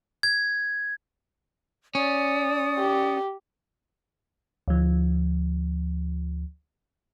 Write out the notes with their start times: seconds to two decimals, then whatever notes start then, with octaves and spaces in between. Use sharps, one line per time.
0.23 G#6
1.95 C#4 D5 D#6
2.79 G4
4.68 D2 F3